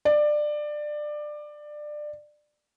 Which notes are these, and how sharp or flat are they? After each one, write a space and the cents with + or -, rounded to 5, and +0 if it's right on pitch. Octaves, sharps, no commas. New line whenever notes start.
D5 +20